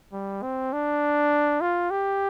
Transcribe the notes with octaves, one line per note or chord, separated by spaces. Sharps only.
G3
C4
D4
F4
G4